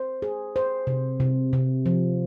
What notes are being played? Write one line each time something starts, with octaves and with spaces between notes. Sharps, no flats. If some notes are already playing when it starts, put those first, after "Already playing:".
Already playing: C5
G#4
C5
C3
C3
C3
F3